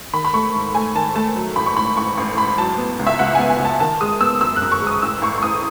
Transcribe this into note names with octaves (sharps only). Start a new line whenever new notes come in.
D#3 B5
B5
A3 C#6
G#2
A3 G#5
D#3 A5
A3 A5
F#3
A1 B5
C#6
G#2 B5
A1 C#6
A1 C#6
G#2 B5
F#3 A5
B3
C#2
E5
C#2 F#5
B3 G#5
G#5
C#2
A5
D#3 A5
G#3 D#6
B3 E6
F#2 E6
F#6
F#2
C#6
G#3
D#6
A1 E6
A1 C#6
C#6
A1 D#6